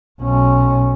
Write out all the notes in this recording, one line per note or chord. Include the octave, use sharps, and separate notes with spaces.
B1 C#4